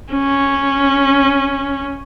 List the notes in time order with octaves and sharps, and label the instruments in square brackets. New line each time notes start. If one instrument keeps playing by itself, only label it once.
[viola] C#4